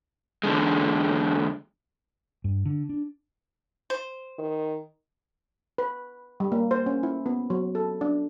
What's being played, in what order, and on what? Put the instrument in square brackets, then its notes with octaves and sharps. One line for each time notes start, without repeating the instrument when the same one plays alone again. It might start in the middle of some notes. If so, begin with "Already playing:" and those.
[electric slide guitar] E2 D3 G#3
[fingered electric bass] G2
D3
D4
[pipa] C5
[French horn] D#3
[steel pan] B4
G3
A#3
C5
C#4
E4
B3
F#3
A4
D4